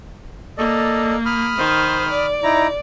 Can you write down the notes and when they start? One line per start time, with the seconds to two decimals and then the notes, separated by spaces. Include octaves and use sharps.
0.58 A#3 A4 D5 D#5
1.25 B5 D#6 F6
1.57 D#3 C5
2.10 D5
2.43 D#4 E4 A#5